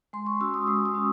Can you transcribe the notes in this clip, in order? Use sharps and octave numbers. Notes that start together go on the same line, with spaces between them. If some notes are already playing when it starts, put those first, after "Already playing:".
G#3 C6
C#6
C#4 F#4 E6
D#6
G#3 D#6
D#6
C#4 F#4